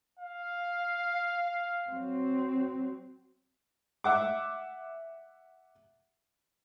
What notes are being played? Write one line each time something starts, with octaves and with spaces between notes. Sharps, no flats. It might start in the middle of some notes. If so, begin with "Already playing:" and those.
F5
F#3 C4
E5 F#5 D6